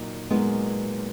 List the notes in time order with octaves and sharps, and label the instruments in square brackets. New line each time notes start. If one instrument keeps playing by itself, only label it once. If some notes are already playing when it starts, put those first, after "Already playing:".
Already playing: [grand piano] A#2 F#3 A#3 D#4
[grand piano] A#2 F#3 A#3 D#4 [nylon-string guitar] G#3 B3